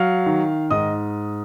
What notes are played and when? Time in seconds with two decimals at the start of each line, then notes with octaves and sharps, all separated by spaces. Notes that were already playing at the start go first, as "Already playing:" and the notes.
Already playing: F#3 F5 F6
0.26 D#3
0.70 G#2 D#5 D#6